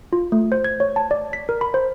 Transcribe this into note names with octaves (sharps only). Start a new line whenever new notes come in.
F4
A3
C5
G#6
C#5
A5
D5
B6
A#4
B5
C5